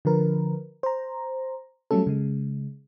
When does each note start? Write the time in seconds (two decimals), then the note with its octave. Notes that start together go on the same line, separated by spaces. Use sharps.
0.05 D3 F3 A#4 B4
0.83 C5 A#5
1.91 F#3 G3 A3 C#4 A4
2.07 C#3 G#3